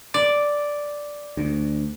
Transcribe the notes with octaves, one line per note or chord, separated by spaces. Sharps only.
D5
D2